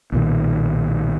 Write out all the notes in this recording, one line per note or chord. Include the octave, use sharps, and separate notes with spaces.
B1 A#2 D#3